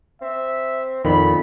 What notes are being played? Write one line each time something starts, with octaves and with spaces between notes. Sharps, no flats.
C4 E5
F2 A#2 D#3 B5